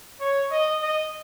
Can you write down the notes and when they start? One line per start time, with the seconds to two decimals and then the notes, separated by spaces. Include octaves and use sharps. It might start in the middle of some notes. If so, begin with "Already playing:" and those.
0.21 C#5
0.51 D#5
0.82 D#5